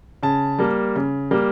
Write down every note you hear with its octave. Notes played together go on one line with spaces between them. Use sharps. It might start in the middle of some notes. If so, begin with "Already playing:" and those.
C#3 A5
G3 A#3
C#3
G3 A#3